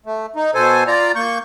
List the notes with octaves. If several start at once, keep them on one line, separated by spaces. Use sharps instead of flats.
A3
D#4
B2 A4 C5 G#5
F4 D5 A#5
A#3 C#6 G6